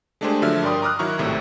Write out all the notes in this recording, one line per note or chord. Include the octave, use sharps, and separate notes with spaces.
G#3 A3 D4 G4 G#4 C5
D3 F3 F#3 E5 F6
G2 A#4 D5 G5 C6 D#6
A#5 D6 D#6 F6 F#6
D#3 F#3 E4 A#5 C#6 F6
G#1 A2 C3 E5